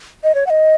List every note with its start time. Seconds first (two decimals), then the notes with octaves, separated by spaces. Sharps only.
0.24 D#5
0.35 C#5
0.47 F#5
0.50 D#5